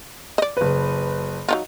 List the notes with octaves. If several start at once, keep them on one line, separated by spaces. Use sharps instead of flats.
D5 D#5
F#1 B4
F#3 D#4 F4